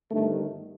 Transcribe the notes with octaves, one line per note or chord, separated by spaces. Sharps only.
G1 G2 D#3 A3